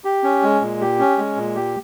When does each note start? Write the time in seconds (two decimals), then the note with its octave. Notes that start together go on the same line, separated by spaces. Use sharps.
0.05 G4
0.24 C#4
0.43 G#3
0.62 A#2
0.81 G4
0.99 C#4
1.18 G#3
1.36 A#2
1.56 G4